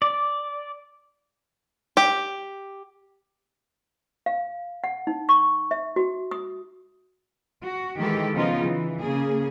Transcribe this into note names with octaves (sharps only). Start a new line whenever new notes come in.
D5
G4
F5
F#5
D#4
C#6
E5
F#4
D#6
F#4
D#3 E3 G#3 G4 A4
C#3 F3 B3 D#4 F4
E3
C#3 A#3 G#4